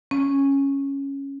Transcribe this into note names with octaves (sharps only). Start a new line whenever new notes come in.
C#4